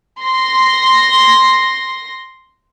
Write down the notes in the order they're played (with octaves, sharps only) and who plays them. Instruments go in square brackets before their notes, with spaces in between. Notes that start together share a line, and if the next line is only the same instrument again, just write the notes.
[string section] C6 A#6